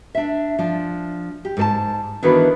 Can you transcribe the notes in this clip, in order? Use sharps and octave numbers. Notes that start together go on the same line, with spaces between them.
D4 E5
F3 D4
G4
G#2 A4 A5
D#3 E3 B3 D4 F#4 B4